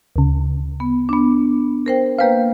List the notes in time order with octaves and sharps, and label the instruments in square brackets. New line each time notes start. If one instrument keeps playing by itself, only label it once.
[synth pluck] D2 C#3
[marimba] B3
B3 D4
A#4 C5 G5
[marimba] A#3 B4 C5 [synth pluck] F5 G5